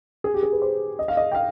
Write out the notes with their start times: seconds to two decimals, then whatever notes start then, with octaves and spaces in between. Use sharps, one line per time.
0.24 G#4
0.34 G4
0.43 G#4
0.53 B4
0.62 C5
0.99 D#5
1.08 F5
1.17 D#5
1.32 G5
1.35 F5